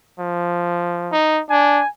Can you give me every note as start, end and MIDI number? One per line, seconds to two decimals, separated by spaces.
0.19 1.14 53
1.12 1.42 63
1.50 1.82 62
1.50 1.88 80